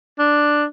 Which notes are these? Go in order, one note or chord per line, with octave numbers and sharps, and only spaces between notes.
D4